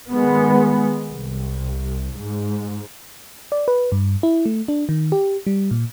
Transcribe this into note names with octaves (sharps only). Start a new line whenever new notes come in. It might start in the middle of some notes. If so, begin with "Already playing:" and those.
D#3 G#3 B3
C2
G#2
D5
B4
G2
E4
A3
D4
D#3
G4
G3
A#2